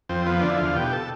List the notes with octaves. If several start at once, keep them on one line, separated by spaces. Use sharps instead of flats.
F2 C4
F3 B3
D3 D4
E4
E2 F4
B2 G4
A4